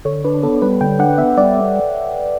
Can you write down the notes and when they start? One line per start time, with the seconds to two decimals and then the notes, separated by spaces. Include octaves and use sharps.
0.05 D3 C#5
0.25 D4 B4
0.43 B3 A4
0.62 G3 B4
0.81 D3 G5
0.99 D4 F#5
1.18 B3 E5
1.37 G3 D5